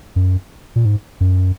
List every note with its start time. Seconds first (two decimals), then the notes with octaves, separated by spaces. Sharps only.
0.16 F#2
0.76 A#2
0.85 G#2
1.21 F#2